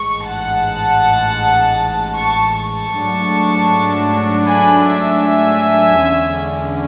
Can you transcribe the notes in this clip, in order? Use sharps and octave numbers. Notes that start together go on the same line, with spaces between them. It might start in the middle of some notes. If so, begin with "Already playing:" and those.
Already playing: A1 G#2 G#3 C#6
F#5 A5
A5 C#6
A5 C#6
G#2 F#3 A3 D4
G#5 B5
E5 G#5
E2 D3 G#3 C#4